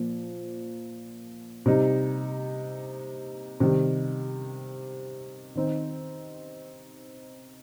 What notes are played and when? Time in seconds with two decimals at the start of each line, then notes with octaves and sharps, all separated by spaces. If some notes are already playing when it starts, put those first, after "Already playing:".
Already playing: A#2 F3 A#3
1.66 C3 G3 D#4
3.60 C3 D#3 G3
5.55 D#3 C4 D#4